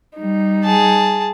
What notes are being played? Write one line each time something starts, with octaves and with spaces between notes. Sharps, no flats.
G3 D#4
G#4 A5